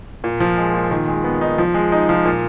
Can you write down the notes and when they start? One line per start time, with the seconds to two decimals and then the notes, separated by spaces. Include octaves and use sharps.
0.24 A#2
0.40 F3
0.57 G#3
0.74 A#2
0.91 D#3
1.08 G#3
1.24 B3
1.41 D#4
1.58 F3
1.74 G#3
1.92 D#4
2.09 F3
2.26 A#2